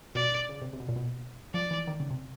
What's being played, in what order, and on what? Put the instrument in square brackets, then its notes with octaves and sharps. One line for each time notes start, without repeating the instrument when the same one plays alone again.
[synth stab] B2 [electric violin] D5
[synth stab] C#3
C3
C3
B2
A#2
B2
[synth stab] F3 [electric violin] D5
[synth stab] E3
D#3
C#3
C3